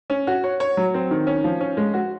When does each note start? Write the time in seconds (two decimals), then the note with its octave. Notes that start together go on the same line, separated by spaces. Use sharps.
0.10 C#4
0.27 F#4
0.44 C#5
0.60 C#5
0.77 F#3
0.94 C4
1.11 D#3
1.27 C#4
1.44 F3
1.60 C#4
1.77 G#3
1.94 F#4